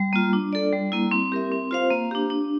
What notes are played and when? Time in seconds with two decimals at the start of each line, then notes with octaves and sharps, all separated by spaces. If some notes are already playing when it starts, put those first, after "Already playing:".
Already playing: G3
0.13 A#3 F4
0.33 D4
0.53 A4 D5
0.72 G3
0.92 A#3 E4
1.11 C4
1.32 G4 A#4 E5
1.52 C4
1.71 F4 C5 F5
1.91 A#3
2.11 D4 G4
2.30 D4